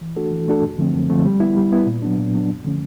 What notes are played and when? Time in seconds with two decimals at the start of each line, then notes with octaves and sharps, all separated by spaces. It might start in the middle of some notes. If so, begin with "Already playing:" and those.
0.01 E3
0.16 A3 D4 F#4 A4
0.33 E3
0.48 A3 D4 F#4 A4
0.63 F#2
0.78 D3 F3 A3 C4
0.94 F#2
1.10 D3 F3 A3 C4
1.26 G3
1.40 B3 E4
1.57 G3
1.72 B3 E4
1.86 A#2
2.03 F#3 B3 D4
2.18 A#2
2.34 F#3 B3 D4
2.49 F#2
2.65 D3 F3 A3 C#4